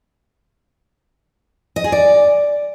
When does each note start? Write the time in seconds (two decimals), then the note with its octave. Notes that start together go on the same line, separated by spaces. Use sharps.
1.76 D#5
1.84 G#4
1.92 D5